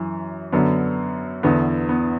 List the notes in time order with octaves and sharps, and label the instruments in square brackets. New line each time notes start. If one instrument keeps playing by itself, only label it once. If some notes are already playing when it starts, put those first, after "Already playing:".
Already playing: [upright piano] F#2 E3
F#2 D3 B3
E2 D3 B3
B3